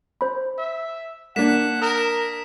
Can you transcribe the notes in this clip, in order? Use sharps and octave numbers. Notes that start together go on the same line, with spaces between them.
C5 B5
E5
A#3 D4 F#5 B6 E7
A#4 D#6 E7